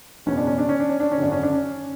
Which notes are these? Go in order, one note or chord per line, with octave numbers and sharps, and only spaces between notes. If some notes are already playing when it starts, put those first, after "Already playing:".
F#1 E2 B2 C#4
D4
C#4
D4
C#4
D4
C#4
D4
C#4
G#1 F#2 D3 D4
C#4
D4
C#4